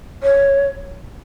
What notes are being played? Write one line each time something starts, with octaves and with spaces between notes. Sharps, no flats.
C#5